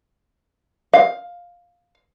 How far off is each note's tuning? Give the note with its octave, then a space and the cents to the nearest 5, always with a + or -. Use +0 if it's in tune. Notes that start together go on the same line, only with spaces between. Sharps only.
F5 +10